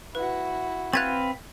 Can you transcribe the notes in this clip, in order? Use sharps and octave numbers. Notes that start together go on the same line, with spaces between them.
E4 F#4 B4
C4 B4 F5 F#6 G#6 A6